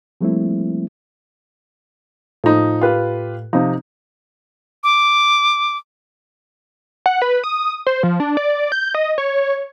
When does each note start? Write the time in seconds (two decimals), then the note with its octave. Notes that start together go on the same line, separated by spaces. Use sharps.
0.21 F3 G3 A3 A#3 C4 E4
2.44 A2 F3 D#4
2.81 F4 G4 B4
3.53 C3 F3 D#4
4.84 D6
7.06 F#5
7.22 B4
7.44 D#6
7.87 C5
8.03 F3
8.20 D4
8.37 D5
8.72 G6
8.94 D#5
9.18 C#5